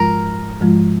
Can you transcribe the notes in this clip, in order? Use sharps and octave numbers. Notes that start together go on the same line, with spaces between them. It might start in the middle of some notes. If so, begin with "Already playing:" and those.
Already playing: G#2 F3 G#3 F4 A#4
G#2 F3 G#3 F4